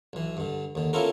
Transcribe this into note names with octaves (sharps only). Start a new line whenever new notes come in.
B1 E3
G2 D3
D#2 D3
B3 C#4 E4 F4 A4 A#4